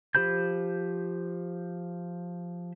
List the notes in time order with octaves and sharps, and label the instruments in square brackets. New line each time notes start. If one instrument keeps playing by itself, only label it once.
[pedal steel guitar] F3 G4 C5 B5 G6